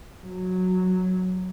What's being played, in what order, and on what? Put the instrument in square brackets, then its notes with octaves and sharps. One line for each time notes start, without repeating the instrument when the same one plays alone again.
[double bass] F#3